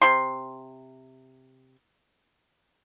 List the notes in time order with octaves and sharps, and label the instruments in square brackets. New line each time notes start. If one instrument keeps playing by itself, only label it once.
[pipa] C3 C6